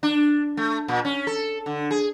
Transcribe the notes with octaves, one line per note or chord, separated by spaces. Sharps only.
D4
A3
A#2
C#4
A4
D3
G#4